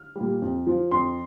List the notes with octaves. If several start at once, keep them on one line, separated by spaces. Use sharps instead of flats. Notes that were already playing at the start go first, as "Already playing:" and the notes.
Already playing: F6
A#2 G3
F2
F3
F2 C6